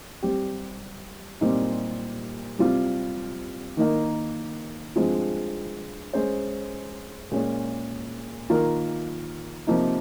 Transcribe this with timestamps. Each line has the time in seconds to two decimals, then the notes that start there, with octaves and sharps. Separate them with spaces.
0.23 G3 C4 G4
1.41 A#2 G3 C4 D#4
2.59 C3 G3 C4 F4
3.77 D#3 A#3 D#4 A#4
4.96 G2 F3 G#3 C4 F4
6.13 G#3 C#4 G#4 C5
7.31 A#2 G#3 C#4 G#4
8.50 D#3 A#3 F4 A#4
9.67 C3 F3 A#3 D#4